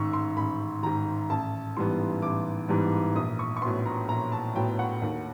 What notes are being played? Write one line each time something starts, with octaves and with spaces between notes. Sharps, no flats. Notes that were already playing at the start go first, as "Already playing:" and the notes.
Already playing: A1 G#2 D#3 C#6 E6
C6
A1 B5
G#2 D#3 A#5
A1 A5
G#2 E3 G3 B3 C6
A1 D6
G#2 E3 G3 B3
A#1 D#6
C#6
C#6
A2 F#3 B3 C6
A#5
A#1 A#5
A5
A2 F#3 B3 G5
F#5
D#2